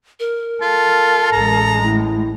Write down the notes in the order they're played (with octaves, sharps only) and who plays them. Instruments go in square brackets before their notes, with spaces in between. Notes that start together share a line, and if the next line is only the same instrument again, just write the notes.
[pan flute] A#4
[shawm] F4 [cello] A4
[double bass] A1 G#3 [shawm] A#5
[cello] A2 [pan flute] E4